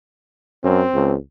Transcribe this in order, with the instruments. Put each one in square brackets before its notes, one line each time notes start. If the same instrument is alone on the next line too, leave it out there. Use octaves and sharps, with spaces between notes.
[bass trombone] F#2 [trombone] C4
[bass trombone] C#2